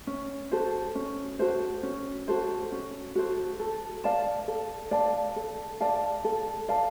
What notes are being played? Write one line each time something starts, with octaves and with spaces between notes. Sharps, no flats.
C#4
F#4 A4 C5
C#4
F#4 A4 C5
C#4
F#4 A4 C5
C#4
F#4 A4 C5
A4
D5 F5 A5
A4
D5 F5 A5
A4
D5 F5 A5
A4
D5 F5 A5